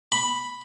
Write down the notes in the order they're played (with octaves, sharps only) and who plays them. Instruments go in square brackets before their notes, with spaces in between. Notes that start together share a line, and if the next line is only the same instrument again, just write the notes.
[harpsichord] B5